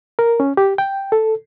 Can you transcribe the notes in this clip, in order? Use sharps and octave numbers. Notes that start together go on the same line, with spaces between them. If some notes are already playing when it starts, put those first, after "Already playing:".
A#4
C#4
G4
G5
A4